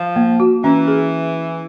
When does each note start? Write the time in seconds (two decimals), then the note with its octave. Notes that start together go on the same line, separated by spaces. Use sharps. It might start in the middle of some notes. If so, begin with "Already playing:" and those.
Already playing: F3
0.16 A#3
0.40 F#4
0.64 E3 C#4
0.88 G#4